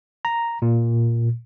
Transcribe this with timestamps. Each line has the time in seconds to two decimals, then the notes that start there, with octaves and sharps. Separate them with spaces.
0.25 A#5
0.62 A#2